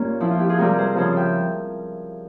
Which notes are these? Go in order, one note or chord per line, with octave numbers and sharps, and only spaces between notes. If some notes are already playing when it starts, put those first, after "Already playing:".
Already playing: A#2 A#3 C#4 F4 G4
F3 C4 E4
F4
E4 G4
F4 G#4
C3 G3 C4 G4 A#4
G#4 C5
C#3 F3 C4 G#4 C5
E5 G5